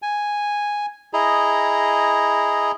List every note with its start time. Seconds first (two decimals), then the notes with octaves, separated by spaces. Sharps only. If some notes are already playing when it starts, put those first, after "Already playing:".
0.02 G#5
1.13 E4 G#4 D#5 A#5